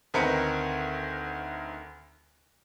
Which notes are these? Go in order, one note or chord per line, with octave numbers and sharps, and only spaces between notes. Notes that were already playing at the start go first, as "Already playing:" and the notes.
D2 D#3 C4 A#4 B4 C#7